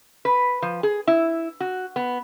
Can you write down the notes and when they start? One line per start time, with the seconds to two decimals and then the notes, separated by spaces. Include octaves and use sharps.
0.25 B4
0.62 F3
0.83 G#4
1.07 E4
1.60 F#4
1.96 B3